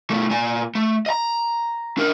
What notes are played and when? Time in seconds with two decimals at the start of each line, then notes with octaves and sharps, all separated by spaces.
0.10 B2 A3
0.31 A#2 G#5
0.75 A3
1.06 D#5 A#5
1.98 D4 A#4